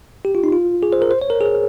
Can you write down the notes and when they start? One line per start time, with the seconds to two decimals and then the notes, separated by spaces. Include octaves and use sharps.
0.25 G4
0.35 F4
0.44 D#4
0.52 F4
0.83 G#4
0.93 C5
1.02 A#4
1.11 C5
1.22 C#5
1.30 A#4
1.41 G#4